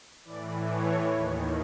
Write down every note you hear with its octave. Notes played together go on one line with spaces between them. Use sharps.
A2 E3 D5
C#5
D#2 D#3